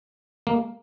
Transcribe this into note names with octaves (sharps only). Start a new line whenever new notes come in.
A#3